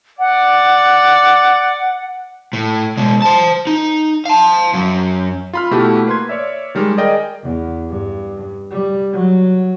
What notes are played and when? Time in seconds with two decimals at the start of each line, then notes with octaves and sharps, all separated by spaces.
0.19 D5 F#5
2.53 A2
2.97 B2 G#3
3.22 C5 A5
3.67 D#4
4.25 F5 A5
4.73 F#2
5.53 F4 B5 F6
5.71 B2 A3 E4 F#4 G4
6.06 A#3 B4 C6 G#6
6.29 C#5 D5 E5
6.75 D#3 G3 G#3 F6
6.97 G#4 A#4 D5 D#5 G5
7.44 E2
7.90 G2
8.71 G3
9.12 F#3